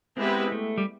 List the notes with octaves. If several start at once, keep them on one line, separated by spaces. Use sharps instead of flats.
G#3 B3 C4 E4 G4 B4
A3
G3